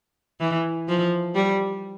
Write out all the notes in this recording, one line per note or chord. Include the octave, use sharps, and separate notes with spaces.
E3
F3
G3